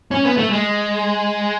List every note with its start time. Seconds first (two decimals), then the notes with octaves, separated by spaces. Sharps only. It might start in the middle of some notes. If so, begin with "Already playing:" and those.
0.11 C#4
0.25 B3
0.37 A3
0.51 G#3